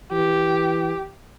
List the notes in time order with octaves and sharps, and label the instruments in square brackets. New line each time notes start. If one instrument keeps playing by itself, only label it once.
[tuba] E3 [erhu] G4